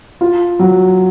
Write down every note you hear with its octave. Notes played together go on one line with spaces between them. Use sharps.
F4
F#3